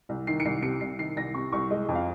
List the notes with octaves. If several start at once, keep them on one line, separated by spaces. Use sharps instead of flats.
C2
D#3 C7
C#7
C2 C7
C3 C#7
C2 C7
D#3 C7
C2 A#6
C3 C#6
C2 C#6
G#3 D#5
F2
F5